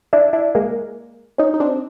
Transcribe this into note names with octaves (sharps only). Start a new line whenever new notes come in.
D4 E4
D4 E4
G#3 A#3
C#4 D#4
D#4
C4 D4